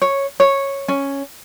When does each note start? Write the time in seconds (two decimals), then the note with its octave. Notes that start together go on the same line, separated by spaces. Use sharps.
0.02 C#5
0.40 C#5
0.88 C#4